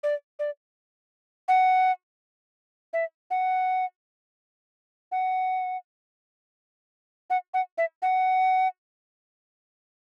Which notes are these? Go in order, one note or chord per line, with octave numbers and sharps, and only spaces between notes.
D5
D5
F#5
E5
F#5
F#5
F#5
F#5
E5
F#5